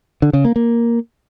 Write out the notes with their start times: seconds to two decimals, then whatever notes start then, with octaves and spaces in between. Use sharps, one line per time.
0.22 D3
0.33 C#3
0.45 A#3
0.56 A#3